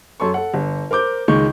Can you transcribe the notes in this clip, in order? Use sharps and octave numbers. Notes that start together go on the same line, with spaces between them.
F#2 A4 C6 C#6
A4 F#5
G1
A#4 C5 D6 G6
C#2 D#3 G#3 D#5 C#6 G6